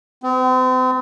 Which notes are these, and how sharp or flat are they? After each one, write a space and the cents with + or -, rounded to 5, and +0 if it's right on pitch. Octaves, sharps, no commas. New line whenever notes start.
C4 -40